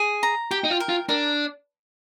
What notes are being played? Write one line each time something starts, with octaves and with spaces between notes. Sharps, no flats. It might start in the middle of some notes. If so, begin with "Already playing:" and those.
Already playing: G#4
A#5
G4 G5
D#4
F4
A#4
F4
D4 A#4